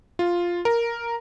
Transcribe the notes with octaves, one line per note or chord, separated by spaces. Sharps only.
F4
A#4